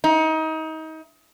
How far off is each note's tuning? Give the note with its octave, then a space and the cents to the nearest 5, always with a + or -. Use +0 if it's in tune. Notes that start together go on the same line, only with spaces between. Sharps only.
D#4 +30